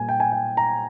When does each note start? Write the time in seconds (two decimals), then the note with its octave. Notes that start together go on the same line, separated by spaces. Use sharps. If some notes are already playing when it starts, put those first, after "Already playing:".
Already playing: A#2 G3 A#3 G#5
0.09 G5
0.20 G#5
0.32 G5
0.57 A#5